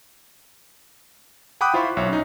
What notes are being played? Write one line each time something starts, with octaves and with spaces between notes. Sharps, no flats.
F#5 G5 B5 D6 D#6 F#6
E4 F4 C5 E5 B5 C#6
B1 C#5 E5
C#4 D#4